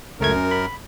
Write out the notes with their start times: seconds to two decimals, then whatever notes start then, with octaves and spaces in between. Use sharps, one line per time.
0.20 C#2 F#2 A3 A#4 G#6
0.36 C#4
0.51 B5